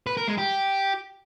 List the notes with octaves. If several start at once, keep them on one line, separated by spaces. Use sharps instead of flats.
B4
A#4
G#3
G4